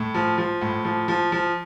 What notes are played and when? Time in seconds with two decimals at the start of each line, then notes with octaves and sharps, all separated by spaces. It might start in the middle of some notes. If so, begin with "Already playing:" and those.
Already playing: A2
0.15 F3
0.38 F3
0.61 A2
0.85 F3
1.08 F3
1.32 F3